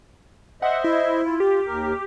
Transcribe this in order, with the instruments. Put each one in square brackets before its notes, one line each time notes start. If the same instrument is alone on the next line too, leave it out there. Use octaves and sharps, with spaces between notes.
[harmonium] C5 D#5 E5 [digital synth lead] F#5
[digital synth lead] E4
[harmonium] F4
[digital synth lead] G4
[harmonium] D#2 A#4